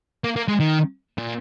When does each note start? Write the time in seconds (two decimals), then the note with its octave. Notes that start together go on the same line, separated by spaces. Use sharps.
0.24 A#3
0.36 A#3
0.48 G#3
0.60 D#3
1.18 A#2